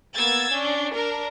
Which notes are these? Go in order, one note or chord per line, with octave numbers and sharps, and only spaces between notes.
A#3 B3 E6 G#6 A6
C#4 D4
D4 A#4